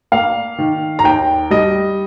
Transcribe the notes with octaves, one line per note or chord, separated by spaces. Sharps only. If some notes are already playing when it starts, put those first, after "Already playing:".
A#3 F5
D#3
A#5
D#2 G5
G3 D#5